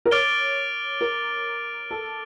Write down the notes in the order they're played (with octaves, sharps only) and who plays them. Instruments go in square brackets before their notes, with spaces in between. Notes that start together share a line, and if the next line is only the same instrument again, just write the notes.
[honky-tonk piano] A#4
[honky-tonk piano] C#5 [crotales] D6 F6 A6 D7 G7
[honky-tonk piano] A#4
A4